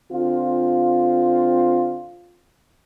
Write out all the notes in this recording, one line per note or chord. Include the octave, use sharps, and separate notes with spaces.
D3 C4 F4